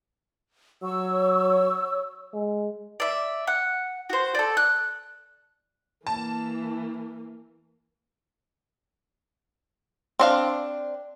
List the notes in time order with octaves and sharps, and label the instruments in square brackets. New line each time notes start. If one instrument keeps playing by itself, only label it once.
[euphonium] F#3 [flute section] C#5 C#6 E6
[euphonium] G#3
[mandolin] D5 E5
F#5
F#4 C5
A4 D5
F#6
[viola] E3 A#3 [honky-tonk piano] A5
[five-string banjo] C4 D4 F5